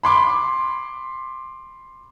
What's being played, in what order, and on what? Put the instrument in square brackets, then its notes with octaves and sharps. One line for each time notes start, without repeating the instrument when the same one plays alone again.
[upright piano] B5 C6 D6